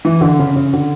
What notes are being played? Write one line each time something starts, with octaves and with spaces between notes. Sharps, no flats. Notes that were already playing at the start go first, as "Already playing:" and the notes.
E3
D3
C#3
C#3
D3